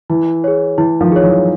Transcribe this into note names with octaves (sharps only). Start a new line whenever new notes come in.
E3 E4
G#4 C#5
E3 E4
D#3 F3
G#4 C#5
E3 F#3